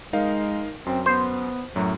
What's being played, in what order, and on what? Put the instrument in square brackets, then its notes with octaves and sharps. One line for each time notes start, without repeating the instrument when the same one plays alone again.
[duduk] G#3 [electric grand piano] D#4 A#4 F5
[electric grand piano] F#2 C6 [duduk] C4
[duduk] B3 [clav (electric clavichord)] C5
[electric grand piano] F#2 A2 [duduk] F#3